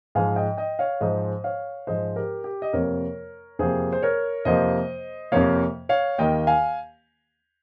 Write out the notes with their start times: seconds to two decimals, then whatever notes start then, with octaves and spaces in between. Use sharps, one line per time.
0.15 G#2 F3 G#3 F5 G#5
0.36 D#5 G5
0.57 D#5 G5
0.79 C#5 F5
1.01 G#2 F3 G#3 C5 D#5
1.44 C#5 F5
1.87 G#2 F3 G#3 C5 D#5
2.16 G4 A#4
2.44 G4
2.62 D#5
2.73 F2 C3 F3 A#3 A#4 C#5
3.59 F2 C3 F3 A#3 G#4 C5
3.93 C5
4.03 A#4 C#5
4.45 F2 C3 F3 A#3 C5 D#5
5.32 F2 C3 F3 A#3 C#5 F5
5.89 C#5 F5
6.18 D#2 D#3 A#3 D#5 G5
6.47 F5 G#5